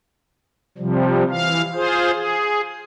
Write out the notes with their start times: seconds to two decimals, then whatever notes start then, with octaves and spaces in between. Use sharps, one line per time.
0.78 C3 F3 G3
1.30 E3 F5
1.74 F4 G#4 C5
2.12 G#4